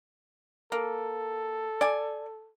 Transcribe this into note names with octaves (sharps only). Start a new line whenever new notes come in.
A#3 A4
D5 G#5